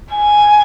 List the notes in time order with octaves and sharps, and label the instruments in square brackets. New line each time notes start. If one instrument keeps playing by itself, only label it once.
[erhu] G#5